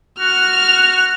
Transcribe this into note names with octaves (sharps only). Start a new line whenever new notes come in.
F#4 F6